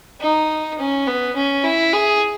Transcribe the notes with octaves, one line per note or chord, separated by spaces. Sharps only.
D#4
C#4
B3
C#4
E4
G#4